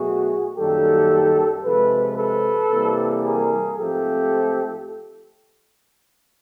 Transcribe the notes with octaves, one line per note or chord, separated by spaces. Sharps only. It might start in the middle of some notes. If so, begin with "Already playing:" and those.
Already playing: B2 F#3 A3 F#4 G#4
F#2 D#3 G3 A#3 G4 A4
C3 F3 G#3 A4 B4
A4 B4
C3 E3 G3 A#3
G#4 A#4
G#2 F3 A3 C4 G4 A4